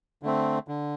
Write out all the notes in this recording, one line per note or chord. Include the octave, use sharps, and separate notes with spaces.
D3 A3 C4
D3